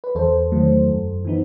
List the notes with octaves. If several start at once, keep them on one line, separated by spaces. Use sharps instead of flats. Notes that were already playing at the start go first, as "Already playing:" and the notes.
B4
E2 A4 C5
D#3 F#3 A3
F#2
E3 B3 D#4